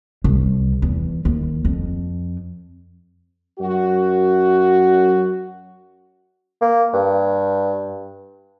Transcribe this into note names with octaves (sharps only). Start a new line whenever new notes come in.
C2
E2
D#2
F2
F#2 F#4
A#3
G2